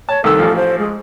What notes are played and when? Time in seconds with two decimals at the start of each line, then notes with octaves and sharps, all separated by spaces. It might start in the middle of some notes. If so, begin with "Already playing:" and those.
0.09 C#5 A5
0.24 C2 D#3 A4 E6
0.39 A1 F3
0.56 C5
0.79 G#3